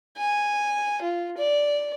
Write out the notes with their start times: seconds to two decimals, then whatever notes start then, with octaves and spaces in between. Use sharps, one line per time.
0.17 G#5
1.02 F4
1.38 D5